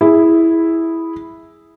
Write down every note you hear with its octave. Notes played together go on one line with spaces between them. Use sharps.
E4 G#4